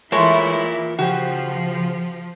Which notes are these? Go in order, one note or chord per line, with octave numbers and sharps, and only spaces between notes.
E3 G#3 A3 E4 F4 A#4 C#5
C#3 F3 F#4 G4